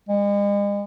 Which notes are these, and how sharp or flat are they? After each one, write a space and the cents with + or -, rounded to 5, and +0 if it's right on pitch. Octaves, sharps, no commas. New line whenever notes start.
G#3 -40